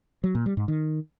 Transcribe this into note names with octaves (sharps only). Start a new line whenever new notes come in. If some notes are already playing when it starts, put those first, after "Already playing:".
F#3
A#2
G3
G#2
D#3